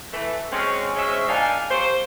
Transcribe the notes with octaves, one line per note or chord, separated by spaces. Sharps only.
E3 A3
F#3 G#3 C4 C#4
F#3 G#3 C#4 C5 E5
A#2 D4 D#4 F5 G5 G#5
F#3 A#3 G4 C5